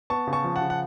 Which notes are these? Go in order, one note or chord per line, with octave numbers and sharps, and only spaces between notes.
B3 A5 C#6
C#3
A5 C#6
F3
F#5 A5
C#3
F#5